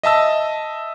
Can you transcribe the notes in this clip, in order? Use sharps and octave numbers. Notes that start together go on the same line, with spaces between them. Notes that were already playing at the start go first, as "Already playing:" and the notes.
D#5 E5 A5 E6